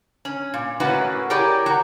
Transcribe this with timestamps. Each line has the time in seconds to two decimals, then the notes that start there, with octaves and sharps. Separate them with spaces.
0.25 C#4
0.54 A#2
0.80 A2 A#3 C#4 E4 F#4 B4
1.30 E4 G4 G#4 A#4 C#5 D5
1.66 F#3 F#4 A#5